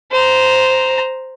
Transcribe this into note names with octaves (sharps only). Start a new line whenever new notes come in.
C5 A#5